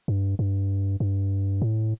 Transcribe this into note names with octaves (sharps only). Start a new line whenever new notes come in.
G2
G2
G2
A2